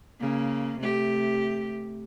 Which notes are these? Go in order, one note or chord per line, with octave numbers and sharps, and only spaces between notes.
C#3 A#3
C3 A3 G4